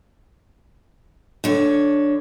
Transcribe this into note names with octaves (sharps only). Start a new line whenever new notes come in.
D3 C#5